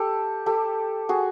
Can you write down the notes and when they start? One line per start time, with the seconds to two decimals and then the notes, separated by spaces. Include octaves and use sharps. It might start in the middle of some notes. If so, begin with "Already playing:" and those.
Already playing: G4 A4
0.46 G4 A4
1.09 F#4 G#4